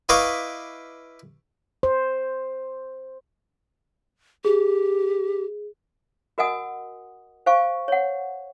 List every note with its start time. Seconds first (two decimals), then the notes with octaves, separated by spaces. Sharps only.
0.09 E4 B4 D#5 F5 C#6 D6
1.83 C5
4.45 G4 G#4
6.38 F#4 A#4 D#5 F#5 G#5 D#6
7.46 C5 F5 G#5 C#6
7.88 C#5 F#5